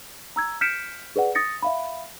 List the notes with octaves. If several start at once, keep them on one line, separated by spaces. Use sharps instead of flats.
A#5 E6 G#6
F6 G6 B6 C#7 D7 E7
G#4 B4 D5 F#5
D#6 A6 A#6 C#7
E5 F5 B5